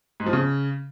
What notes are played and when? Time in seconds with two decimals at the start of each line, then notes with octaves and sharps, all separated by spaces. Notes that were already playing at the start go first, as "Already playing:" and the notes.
0.20 G#2
0.26 F3
0.33 C#3